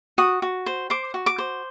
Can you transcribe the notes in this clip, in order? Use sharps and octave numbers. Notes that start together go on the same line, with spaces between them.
F#4 D#6
F#4
C5
C5 D6
F#4
D6
C5